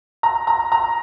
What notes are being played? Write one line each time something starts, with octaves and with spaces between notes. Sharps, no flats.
A#5
A#5
A#5